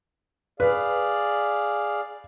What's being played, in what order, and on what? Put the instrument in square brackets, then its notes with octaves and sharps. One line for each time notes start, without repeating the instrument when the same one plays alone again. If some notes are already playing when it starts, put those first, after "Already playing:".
[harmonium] G#4 D5 F5 [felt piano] B4